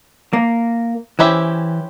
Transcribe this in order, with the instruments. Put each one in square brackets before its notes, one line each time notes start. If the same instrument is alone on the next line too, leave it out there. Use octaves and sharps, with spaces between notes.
[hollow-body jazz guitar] A#3
[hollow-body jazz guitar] E3 [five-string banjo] C#4 E4 G4 C5 E5